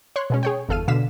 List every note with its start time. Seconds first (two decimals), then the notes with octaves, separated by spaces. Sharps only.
0.16 C#5 C6 C#6 F#6
0.30 B2 G#3 C#4
0.43 G#4 C#5 G5
0.69 G1 E2 A4 F5 F6 D#7
0.88 B2 D3 F5 B6 E7